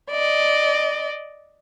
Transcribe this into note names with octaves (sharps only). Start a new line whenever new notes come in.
D5 D#5